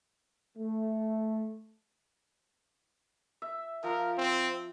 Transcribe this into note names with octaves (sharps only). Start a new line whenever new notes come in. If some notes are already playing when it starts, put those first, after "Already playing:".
A3
E5
F3 A#4 F5
C4